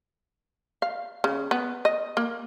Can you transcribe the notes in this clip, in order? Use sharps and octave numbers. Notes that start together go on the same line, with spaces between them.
F5
C#3
B3
D#5
A#3